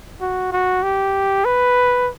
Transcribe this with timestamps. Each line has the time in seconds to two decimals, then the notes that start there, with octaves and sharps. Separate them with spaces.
0.21 F#4
0.52 F#4
0.83 G4
1.45 B4